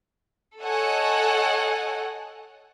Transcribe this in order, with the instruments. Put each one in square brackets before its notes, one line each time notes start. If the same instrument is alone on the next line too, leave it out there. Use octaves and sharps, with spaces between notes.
[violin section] A4 C#5 D#5 F#5 G#5